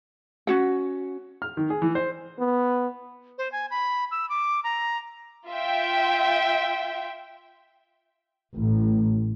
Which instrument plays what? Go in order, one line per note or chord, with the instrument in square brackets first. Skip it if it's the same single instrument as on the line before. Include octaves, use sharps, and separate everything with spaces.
[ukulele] C#4 F#4 F#5
[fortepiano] F6
D#3
G#4
E3
C5
[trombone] B3
[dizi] C5
G#5
B5
E6
D6
A#5
[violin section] F4 E5 G5
[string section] A1